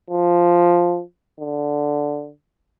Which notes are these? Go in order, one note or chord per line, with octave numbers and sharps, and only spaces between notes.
F3
D3